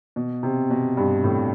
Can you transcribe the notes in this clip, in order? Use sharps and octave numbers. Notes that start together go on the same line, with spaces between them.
B2
C3
B2
G2
A2